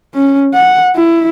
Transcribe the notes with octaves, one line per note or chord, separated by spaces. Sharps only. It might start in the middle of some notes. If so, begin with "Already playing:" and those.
C#4
F#5
E4